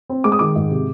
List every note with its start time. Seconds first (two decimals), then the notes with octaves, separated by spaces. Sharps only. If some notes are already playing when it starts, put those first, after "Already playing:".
0.10 C4
0.24 G#3 D6
0.32 D#6
0.39 D#3 D6
0.56 G#2
0.71 C3